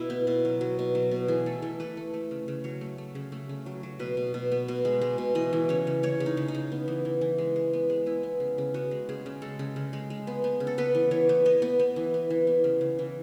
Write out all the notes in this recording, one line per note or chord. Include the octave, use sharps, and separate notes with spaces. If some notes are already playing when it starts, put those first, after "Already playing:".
Already playing: B2 E4
B3
B2
F#3
F#3
B2
F#3
B2
E3 G#4
A3 A4
E3 A4
A3 B4
A3
A3
C#3
C#3
F#3 C#5
A3
A3
C#3
A3
C#3
F#3
F#3
B2 B4
B2
B2
B3
B2
G#3
G#3
B2
E3 D#5
E3
C#3 C#5
C#3
C#3 C#5
C#3
D#4
C#3
D#4
C#3
B3
E3
E3
E3
G#3
G#3
B3
G#3
B3 E4
B3
C#3
C#3
B3 F#4
G#3
C#3 G#4
C#3
G#3 A4
C#3
C#3
G#3
G#3
B3
B3
C#3
A4
B3 B4
E3
E3 C#5
B3
B3 D#5
B3
B3
E3
B3
E3
B3
C#3
C#3
E3